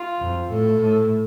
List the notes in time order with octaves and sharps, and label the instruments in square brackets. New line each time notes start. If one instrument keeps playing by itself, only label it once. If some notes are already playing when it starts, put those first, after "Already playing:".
Already playing: [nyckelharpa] F4
[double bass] F2
[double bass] A2 [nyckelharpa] A4
[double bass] A2